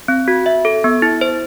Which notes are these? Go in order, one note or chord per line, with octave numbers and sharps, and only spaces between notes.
C4
F#4
E5
A4
B3
E4
C5